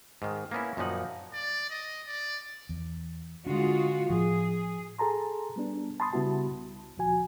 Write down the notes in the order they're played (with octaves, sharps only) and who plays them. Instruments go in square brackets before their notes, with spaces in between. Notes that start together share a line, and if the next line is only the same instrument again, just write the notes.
[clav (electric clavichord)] G#2 D#3
A#3 B3 C#4 E4
F#2 A#2 D#3 F3 D#4 F#5
[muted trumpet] D5
D#5
D5
[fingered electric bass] E2
[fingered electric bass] D3 D4 [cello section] G#3 F4 F#4
[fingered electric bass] A2 F3 [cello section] G#4
[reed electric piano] G#4 A4 A5 A#5 C6
G3 B3 D4
A5 B5 C6 D#6 A6
C#3 G3 B3 E4 F#4 A5
C2
D2 A#2 F3 F#4 G#5